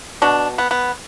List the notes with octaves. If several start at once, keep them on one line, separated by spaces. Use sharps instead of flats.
B2 D4
B3
B3